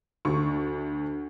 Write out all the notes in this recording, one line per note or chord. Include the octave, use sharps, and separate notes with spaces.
D2 C#6